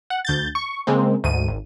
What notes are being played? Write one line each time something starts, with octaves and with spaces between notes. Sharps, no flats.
F#5
D2 G6 A6
C#6
C#3 G#3 A#3 C4
D2 G#2 D#7
G#1